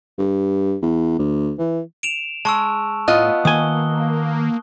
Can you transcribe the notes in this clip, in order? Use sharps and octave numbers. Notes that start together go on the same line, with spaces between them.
G2
E2
D2
E3
D7 E7 F7
G#3 A5 C#6 E6
A2 B3 F4 D#5 F#6
D#3 A#3 G#5 D#6 G7